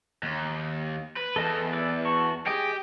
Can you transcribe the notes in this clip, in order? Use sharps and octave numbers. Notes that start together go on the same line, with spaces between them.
D#2
B4
E2 A4 D#5 A5
B4 D5 E5
F#4 A5 C#6
G4 G#4 D#5 G5